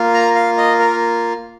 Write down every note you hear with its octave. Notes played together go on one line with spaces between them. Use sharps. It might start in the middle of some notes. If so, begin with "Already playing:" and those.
Already playing: A#3 F4
A#5
F5
D#5
A#4